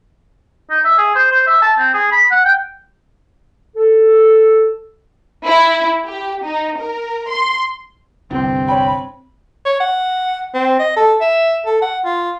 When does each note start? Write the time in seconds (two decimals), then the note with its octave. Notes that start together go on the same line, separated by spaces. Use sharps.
0.70 D#4
0.84 E5
0.98 G#4
1.15 C5
1.31 C5
1.47 E5
1.62 A5
1.78 C4
1.94 G#4
2.12 B5
2.31 F#5
2.45 G5
3.76 A4
5.45 E4
6.06 G4
6.44 D#4
6.78 A#4
7.30 C6
8.31 G1 C2 G2 C4
8.68 C#5 G5 B5
9.65 C#5
9.80 F#5
10.54 C4
10.79 D#5
10.96 A4
11.21 E5
11.66 A4
11.82 F#5
12.05 F4